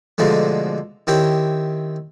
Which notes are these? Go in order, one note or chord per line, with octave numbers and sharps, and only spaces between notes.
G#2 B2 D3 F3 A3
D#3 C4 E4 G4 C#5